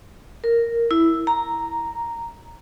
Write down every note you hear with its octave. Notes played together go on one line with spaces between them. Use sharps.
A#4
E4
A#5